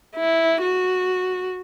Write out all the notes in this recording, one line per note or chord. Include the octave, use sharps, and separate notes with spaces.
E4
F#4